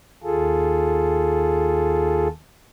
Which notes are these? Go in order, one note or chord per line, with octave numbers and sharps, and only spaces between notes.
D#2 F4 G#4 A4